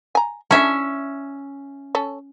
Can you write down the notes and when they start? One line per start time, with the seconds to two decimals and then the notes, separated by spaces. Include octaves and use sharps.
0.15 G#5 A#5
0.51 C#4 D4 E4 A4 E5
1.95 C#4 A4